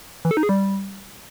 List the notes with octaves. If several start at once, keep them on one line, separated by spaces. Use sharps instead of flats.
E3
A4
D#4
G#4
G3